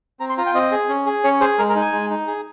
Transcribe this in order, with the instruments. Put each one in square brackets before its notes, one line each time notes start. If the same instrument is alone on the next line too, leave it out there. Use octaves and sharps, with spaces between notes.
[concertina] C4 A#5
C6
F4 A#5
G5
C4 D#5
G#4
C#4
G#4
C#4 C#5
G#4 C5
G#3 A#4
A#4
D#4
G#5
G#3
D#4
G#4